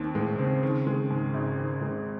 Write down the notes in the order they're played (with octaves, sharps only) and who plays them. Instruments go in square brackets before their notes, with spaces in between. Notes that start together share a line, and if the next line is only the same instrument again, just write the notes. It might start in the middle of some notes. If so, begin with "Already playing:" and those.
Already playing: [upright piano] D#2 D#3 C4
[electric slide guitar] A2 [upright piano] G#3
[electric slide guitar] C#3 [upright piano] C4
[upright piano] D#3
G#3
G#2
G#1
D#3
G#3